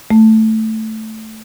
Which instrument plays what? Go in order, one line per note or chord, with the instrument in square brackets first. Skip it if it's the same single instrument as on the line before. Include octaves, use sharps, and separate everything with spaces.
[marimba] A3